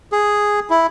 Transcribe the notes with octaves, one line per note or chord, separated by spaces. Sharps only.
G#4
E4